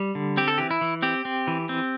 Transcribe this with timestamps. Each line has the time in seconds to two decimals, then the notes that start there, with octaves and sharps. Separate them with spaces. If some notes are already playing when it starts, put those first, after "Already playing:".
Already playing: G3
0.15 D3
0.37 C4 G4
0.48 A4
0.58 E3 G4
0.71 E4
0.81 E3
1.03 C4 G4
1.25 C4
1.48 E3
1.69 C4